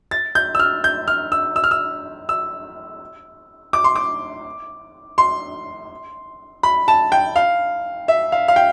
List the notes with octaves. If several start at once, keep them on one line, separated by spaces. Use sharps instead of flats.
A6
G6
E6
F6
G6
F6
E6
E6
F6
E6
E6
D6
C6
D6
C6
B5
A5
G5
F5
E5
F5
F5
G5